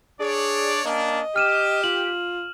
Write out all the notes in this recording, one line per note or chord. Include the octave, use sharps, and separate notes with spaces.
D4 G#4 C#5 D5
A#3 C#4 D4 D#5
G4 F6 D#7 E7
F4 F#7